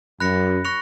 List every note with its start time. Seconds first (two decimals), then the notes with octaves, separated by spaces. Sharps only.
0.20 F#2 B5 F#6 A#6 C#7
0.65 C#6 F#6 A#6 C#7 F7